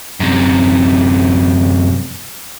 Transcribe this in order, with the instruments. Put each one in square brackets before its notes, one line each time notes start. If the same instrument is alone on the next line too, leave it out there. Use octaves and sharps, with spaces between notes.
[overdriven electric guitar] F#2 C3